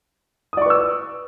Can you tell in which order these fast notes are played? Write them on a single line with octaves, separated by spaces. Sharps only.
D#6 D5 C#6 B4 E6